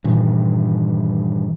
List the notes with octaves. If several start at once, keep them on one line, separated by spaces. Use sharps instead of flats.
G2 A#2 D#3 E3